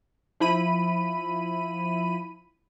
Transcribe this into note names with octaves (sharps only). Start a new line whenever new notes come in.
F3 E4 B5 D#7